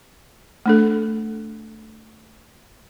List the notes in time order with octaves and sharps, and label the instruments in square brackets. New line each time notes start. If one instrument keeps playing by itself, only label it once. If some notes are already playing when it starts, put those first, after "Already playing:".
[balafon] A3 D4 A4